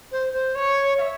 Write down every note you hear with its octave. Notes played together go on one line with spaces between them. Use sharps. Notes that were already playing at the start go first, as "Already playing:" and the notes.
C5
C5
C#5
F5
E5